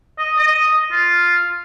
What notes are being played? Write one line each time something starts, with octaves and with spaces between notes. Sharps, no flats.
D#5
D#5
F4